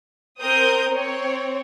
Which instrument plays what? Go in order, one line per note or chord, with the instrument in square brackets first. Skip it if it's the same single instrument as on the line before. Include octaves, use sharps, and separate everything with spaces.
[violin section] C4 A#4 C5 D#6 G6
C4 C#5